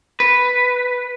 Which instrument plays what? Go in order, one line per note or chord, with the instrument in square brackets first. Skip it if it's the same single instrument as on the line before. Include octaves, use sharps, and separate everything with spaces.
[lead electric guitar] B4